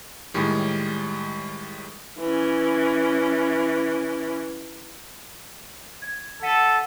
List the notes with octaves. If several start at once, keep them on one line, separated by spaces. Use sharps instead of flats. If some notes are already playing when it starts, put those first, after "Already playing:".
A2 D#3 G3 G#3
E3 C#4
G#6
A4 F#5 B6 D#7